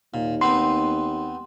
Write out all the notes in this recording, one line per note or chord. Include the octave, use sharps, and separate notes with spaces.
D#2 A#2
B3 C4 D#4 C6